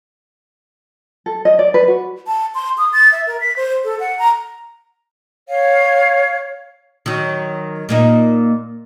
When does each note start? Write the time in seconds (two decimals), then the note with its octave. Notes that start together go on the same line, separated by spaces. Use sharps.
1.26 A4
1.45 D#5
1.59 D5
1.74 B4
1.88 F#4
2.27 A5
2.55 C6
2.78 D#6
2.93 A6
3.12 E5
3.27 A#4
3.40 B6
3.57 C5
3.84 A4
4.00 F#5
4.19 A#5
5.49 C#5 F5
7.06 D#3 F#3
7.89 A#2 A#3 D#4